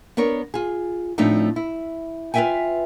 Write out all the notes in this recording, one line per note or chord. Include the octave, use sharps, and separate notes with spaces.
B3 D4 A#4 C#5
F4 G#4
A2 F3 A3 C4 D4 D#4
E4
F4 B4 D5 E5 G5 G#5